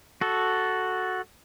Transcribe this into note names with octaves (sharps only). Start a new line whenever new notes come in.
F#4 A4